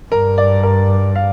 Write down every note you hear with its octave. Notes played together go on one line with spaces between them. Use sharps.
G2 A#4
D5
A#4
F5